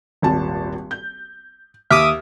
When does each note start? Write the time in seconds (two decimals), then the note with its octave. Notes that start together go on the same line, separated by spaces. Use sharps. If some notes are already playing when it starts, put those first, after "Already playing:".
0.22 D#1 G#1 A5
0.91 G6
1.90 D#2 E5 D6 D#6 F6